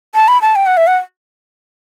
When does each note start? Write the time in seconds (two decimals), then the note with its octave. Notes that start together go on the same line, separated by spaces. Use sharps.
0.15 A5
0.28 B5
0.42 A5
0.56 G5
0.66 F#5
0.77 E5
0.87 F#5